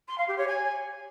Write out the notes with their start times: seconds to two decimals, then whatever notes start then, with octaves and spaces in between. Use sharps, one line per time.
0.08 C6
0.18 F5
0.28 G4
0.38 C#5
0.48 G#5